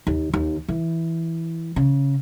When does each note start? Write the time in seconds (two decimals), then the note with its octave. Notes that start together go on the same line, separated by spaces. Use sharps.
0.07 D#2
0.34 D#2
0.68 E3
1.76 C#3